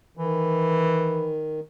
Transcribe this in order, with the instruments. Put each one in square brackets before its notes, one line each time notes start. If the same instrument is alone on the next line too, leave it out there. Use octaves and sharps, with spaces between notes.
[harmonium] D#3 [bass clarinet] E3